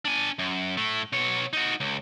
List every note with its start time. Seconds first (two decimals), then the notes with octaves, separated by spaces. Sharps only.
0.05 D4 G#5
0.39 F#2
0.77 A2 A3
1.13 B2 C#5
1.53 D#4 F#4
1.80 C#2